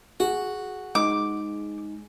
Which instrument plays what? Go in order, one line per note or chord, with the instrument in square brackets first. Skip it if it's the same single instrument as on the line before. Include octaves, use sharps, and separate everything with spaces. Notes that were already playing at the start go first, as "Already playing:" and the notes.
[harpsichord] F#4 [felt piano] G#4
[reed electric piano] G#3 D#4 [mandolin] D6